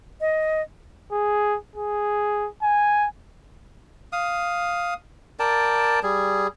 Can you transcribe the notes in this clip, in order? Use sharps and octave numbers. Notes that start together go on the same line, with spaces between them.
D#5
G#4
G#4
G#5
F5 D#6
A#4 D5 G5 A5
G3 G#4